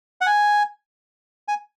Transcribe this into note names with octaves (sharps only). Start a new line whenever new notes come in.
F#5
G#5
G#5